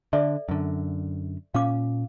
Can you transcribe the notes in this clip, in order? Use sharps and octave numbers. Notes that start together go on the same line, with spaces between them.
D3 A4 D5 E5
F#2 D3
A#2 C#4 F5 D6